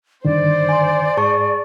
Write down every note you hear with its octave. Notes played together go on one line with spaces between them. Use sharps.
G2 D3 D#3 C5 D5
G#5 C6
G#2 G#4 A5 C#6